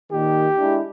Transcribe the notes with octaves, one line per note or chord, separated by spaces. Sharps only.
D#2 A#2 D#3 G4
G#3 D4 E4